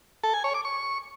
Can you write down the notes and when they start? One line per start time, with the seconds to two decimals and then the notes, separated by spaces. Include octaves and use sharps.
0.24 A4
0.34 G#5
0.44 C#5
0.54 D6
0.65 C#6